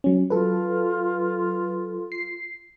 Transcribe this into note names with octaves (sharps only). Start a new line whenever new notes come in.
F#3 C#4
F#3 F4 A4 B4
C7